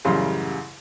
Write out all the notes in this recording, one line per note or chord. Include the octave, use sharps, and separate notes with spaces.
A1 F#2 C#3 G3 F5 C6